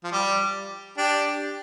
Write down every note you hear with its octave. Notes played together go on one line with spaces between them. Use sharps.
F3
G3
D4 G4